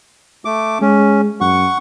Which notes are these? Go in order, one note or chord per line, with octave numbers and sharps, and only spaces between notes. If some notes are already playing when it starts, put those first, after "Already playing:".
A3 D6
G#3 C#4
F#2 F#5 C#6